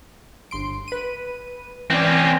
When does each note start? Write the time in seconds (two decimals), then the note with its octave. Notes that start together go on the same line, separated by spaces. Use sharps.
0.51 G1 C6 D7
0.88 B4 D#7
1.90 E3 C4 C#4 D5